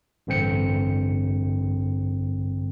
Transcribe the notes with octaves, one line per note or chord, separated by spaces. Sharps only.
A1 G2 D3 C4 G5 C#7